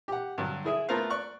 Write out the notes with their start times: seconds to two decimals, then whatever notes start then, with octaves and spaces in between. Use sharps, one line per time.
0.08 G4 F#5
0.38 G2 D3 F#3
0.65 E4 G#4 E5 D#6
0.89 A3 B3 F4 A#4 C5 F5
1.10 D5 C#6 F#6